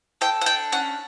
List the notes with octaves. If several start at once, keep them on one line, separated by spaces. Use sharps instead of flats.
A4 G5
F#5
D4 G5
C#4 F#5